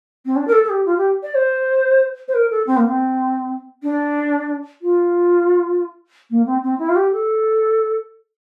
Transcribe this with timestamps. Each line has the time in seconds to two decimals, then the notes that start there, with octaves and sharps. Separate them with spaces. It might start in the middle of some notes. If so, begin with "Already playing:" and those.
0.25 C4
0.35 D4
0.47 A#4
0.52 A4
0.64 A4
0.69 G4
0.85 F4
0.97 G4
1.22 D5
1.34 C5
2.27 C5
2.34 A#4
2.50 A4
2.66 C4
2.77 A#3
2.87 C4
3.82 D4
4.81 F4
6.30 A#3
6.45 C4
6.63 C4
6.78 E4
6.88 F4
6.95 G4
7.12 A4